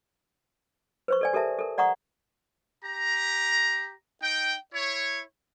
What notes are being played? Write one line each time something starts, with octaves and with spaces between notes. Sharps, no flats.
B4 C5 C#6
A4 D5 G#5
G4 A4 A#4 E5 A5
A4 A#4
D5 F#5 A#5 C#6 D#6
G4 A#5
D#4 G5
E4 C#5